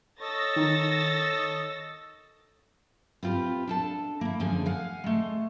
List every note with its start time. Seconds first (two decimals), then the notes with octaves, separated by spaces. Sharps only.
0.21 A4 C#5 D#5 E6 A6 A#6
0.56 D#3
3.23 B3 C4 F4 G4 B4
3.67 D4 A4 A5
4.21 A#3 E4
4.40 F#2 D3 F3 G#4 G#5
4.66 F5 F#5 G#5
5.04 G#3 A3